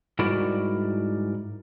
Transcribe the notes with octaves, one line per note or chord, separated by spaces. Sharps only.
G#2 G3 E4 F#4 A#4 D5